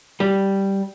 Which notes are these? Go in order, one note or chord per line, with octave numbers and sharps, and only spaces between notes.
G3